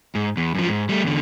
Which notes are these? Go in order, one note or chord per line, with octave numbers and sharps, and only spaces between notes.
G#2
E2
F#2 F3
G#2
G3 A3
E2 D3